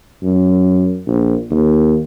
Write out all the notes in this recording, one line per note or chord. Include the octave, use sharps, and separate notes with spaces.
F#2
A#1
D#2